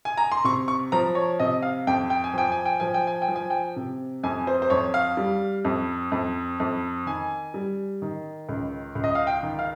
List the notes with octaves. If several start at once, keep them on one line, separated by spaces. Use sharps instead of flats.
G#5
A#5
C6
C3 C#6
C#6
F3 A#5
C#5
C3 D#5
F5
F2 G5
G5
G#5
F3 G5
G#5
G5
F3 G#5
G5
G#5
G5
F3
G#5
G5
C3
F2 G#5
C5
C5
F2 C#5
F5
G3
F2
F2
F2
D#3 G#5
G3
D#3
C#2
C#2
D#5
F5
G5
D#3
F5